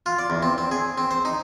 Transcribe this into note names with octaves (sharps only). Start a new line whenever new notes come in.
F4
D5
E2
C4
C4
G#4
C4
C5
D#4